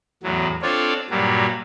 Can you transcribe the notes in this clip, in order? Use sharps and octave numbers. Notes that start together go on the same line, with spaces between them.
E2 A2 F#3
C4 D4 F4 A4 C#5 D5
G2 A#2 F#3 G3